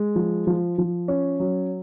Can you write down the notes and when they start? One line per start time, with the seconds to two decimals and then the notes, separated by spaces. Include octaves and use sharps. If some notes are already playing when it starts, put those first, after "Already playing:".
Already playing: G#3
0.15 F3
0.47 F3
0.78 F3
1.08 C#4
1.40 F#3